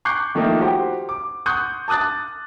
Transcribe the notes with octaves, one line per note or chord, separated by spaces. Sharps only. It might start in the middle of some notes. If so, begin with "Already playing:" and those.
C#6 D6 F#6 G6 C7
D#3 F3 A3 A#3 D#4
F#4 G4 C5
D6
F#5 C6 C#6 D#6 F#6 G6
A5 D6 D#6 F#6 A6